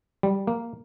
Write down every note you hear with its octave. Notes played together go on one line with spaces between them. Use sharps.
G3
A#3